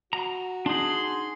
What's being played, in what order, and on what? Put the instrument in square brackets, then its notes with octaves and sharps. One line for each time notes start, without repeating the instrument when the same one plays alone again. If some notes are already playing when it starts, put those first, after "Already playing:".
[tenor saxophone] F#4 [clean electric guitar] A#5
[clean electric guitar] D4 D#4 [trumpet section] G#4 C6 [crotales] C7 F#7